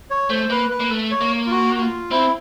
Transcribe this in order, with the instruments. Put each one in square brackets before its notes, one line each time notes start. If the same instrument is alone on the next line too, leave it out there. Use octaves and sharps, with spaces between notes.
[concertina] C#5
[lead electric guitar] A3 [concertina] C5
[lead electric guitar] A#3 [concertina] B4
[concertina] B4
[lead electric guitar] A#3
A3
[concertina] C#5
[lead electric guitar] A#3
[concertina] F4
F#4
F#4
F4
[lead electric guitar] C4 [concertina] E4